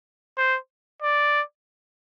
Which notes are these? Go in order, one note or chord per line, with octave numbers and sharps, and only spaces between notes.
C5
D5